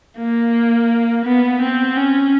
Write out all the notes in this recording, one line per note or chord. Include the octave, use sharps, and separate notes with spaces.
A#3
B3
C4
C#4